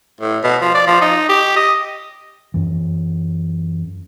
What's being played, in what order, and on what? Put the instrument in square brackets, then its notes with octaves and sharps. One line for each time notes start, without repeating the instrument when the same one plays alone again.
[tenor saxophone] A2
B2
F3
D5
F3
D#4
G4
D#5
[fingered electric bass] F#2 E3